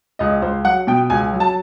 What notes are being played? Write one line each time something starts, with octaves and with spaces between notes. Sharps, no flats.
C#2 D#5
C#2 C5
F#3 F#5
B2 G5
C#2 G#5
F#3
A5